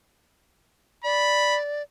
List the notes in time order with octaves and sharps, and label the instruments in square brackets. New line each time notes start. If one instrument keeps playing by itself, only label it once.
[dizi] D5 [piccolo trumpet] B5